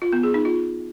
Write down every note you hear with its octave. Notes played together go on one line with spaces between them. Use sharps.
F4
B3
G#4
D#4
F4